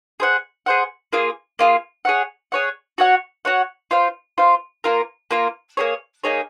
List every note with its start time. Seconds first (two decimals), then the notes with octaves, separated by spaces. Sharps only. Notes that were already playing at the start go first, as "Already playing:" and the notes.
0.20 G#4 C5 F#5
0.66 G#4 C5 F#5
1.13 A#3 F4 G#4
1.59 A#3 F4 G#4
2.05 G#4 C#5 F#5
2.52 G#4 C#5 F#5
2.98 F#4 C#5 F#5
3.45 F#4 C#5 F#5
3.91 F4 C5 F5
4.38 F4 C5 F5
4.84 A#3 F4 A#4
5.31 A#3 F4 A#4
5.77 A#3 D#4 G#4 C#5
6.24 A#3 D#4 G#4 C#5